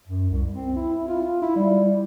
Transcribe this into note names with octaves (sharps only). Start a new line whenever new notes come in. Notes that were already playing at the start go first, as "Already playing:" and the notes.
F#2
C2
C4
E4
F4
E4
G3